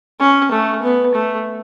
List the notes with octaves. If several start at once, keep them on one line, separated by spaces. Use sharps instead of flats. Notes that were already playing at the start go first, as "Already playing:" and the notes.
C#4
A3
B3
A3